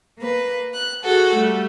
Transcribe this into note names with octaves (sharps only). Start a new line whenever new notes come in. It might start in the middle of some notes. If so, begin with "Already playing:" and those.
A#3 B4
F#6
F#4 G#4 A4 F#5
G3 A3